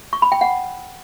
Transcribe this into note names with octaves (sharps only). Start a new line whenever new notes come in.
C#6
B5
G5
F#5